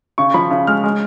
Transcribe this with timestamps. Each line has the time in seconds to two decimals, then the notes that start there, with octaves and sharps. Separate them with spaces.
0.18 C#3 C#6
0.34 F3 B5
0.51 C#3
0.67 G#3 F6
0.84 G#3